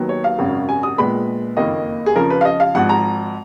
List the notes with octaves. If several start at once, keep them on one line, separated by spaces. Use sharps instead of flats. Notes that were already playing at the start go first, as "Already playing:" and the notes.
Already playing: D#2 D#3 F#3 B3
C#5
F5
G#1 F#2 C#3
G#5
D#6
A#1 A#2 G#3 B3 B5
F#1 F2 D#3 A#3 D#5
G#4
F2 C#3 F3 A#4
B4
F5
D#5
F5
G#1 G#2 F3 F#5
A#5